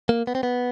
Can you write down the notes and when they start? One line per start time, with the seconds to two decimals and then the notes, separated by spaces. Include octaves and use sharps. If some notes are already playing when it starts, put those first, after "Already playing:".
0.09 A#3
0.27 B3
0.35 C4
0.43 B3